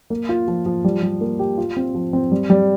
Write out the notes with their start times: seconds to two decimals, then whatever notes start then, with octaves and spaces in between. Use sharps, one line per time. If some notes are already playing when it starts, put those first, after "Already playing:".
0.10 A#3
0.29 F4
0.48 F3
0.66 F3
0.84 G3
1.03 G3
1.21 A#3
1.39 G4
1.58 F4
1.76 C4
1.95 F3
2.13 C4
2.32 G3
2.50 G3